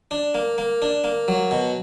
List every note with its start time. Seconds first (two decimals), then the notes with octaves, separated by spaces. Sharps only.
0.11 D4
0.34 A#3
0.58 A#3
0.82 D4
1.04 A#3
1.28 F#3
1.51 B2